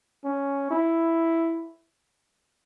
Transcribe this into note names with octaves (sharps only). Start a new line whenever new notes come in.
C#4
E4